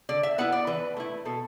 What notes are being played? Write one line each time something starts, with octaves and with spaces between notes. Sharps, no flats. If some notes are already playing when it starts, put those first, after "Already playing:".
D3 D5
E5
B3 E4 F#5
D5
E3 B4
A3 E4
B2 A4